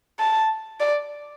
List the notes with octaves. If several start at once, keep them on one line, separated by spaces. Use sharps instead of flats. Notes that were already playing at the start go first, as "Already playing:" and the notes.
A5
D5